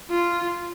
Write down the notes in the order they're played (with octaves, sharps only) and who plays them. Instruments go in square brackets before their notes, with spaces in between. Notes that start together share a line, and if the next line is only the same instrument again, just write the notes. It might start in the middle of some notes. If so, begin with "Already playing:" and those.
[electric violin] F4